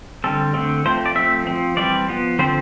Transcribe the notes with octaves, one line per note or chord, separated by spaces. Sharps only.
D3 G3 C4 A4
D3 A3 C4
F3 A3 C4 C5
D5
F3 A3 C4 E5
F3 C4
E3 G3 C4 D5
F3 B3
D3 F3 C4 C5